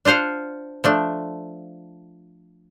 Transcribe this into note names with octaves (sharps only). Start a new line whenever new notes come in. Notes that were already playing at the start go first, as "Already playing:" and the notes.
D4 F4 C5 F5 F#5
F3 A3 D4